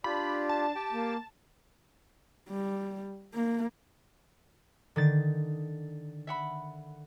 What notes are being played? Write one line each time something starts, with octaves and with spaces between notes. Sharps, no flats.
D4 F4 G4 B5
A5
G4 G5
A#3
G3
A#3
D3 D#3 A6
E5 F#5 B5